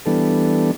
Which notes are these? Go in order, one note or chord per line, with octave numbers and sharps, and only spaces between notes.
E3 G3 B3 D4 A4